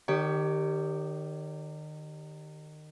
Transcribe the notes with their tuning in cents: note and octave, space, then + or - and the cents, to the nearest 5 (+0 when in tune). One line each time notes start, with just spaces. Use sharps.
D#3 -30 G4 +0 C#5 +20